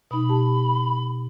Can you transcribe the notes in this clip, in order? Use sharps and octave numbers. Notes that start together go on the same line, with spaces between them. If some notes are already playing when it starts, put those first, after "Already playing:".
B2 D#4 B5
G4 A5